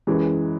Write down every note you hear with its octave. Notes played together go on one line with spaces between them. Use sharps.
F#2 E3 G#3